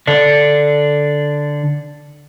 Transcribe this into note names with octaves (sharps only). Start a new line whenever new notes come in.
D3 D4